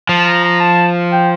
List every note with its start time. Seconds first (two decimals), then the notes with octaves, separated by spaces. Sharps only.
0.09 F3 A5
0.26 A#5
0.44 A#5
0.60 A5
1.12 G5